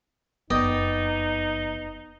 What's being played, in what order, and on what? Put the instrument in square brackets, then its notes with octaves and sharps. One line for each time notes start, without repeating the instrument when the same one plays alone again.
[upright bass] F#1 F2 [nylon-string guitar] B3 [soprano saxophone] D#4 [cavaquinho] D5 D#5 G5